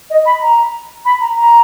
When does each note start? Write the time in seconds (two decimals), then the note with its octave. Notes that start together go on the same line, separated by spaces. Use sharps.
0.10 D#5
0.26 B5
0.42 A#5
1.05 B5
1.21 A#5
1.37 A#5